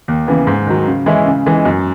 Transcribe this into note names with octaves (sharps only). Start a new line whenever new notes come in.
D#2
C#3 E3 B3
G#2
D#3 F#3
C#3
E3 G#3 C#4 E4
C#3
E3 G#3 D#4
F#2